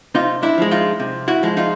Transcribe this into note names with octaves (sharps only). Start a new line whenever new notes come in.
C3 D#4 F4
D4 E4
F3 G#3
D#4 F4
C3
E4 F#4
F3 G#3
D#4 F4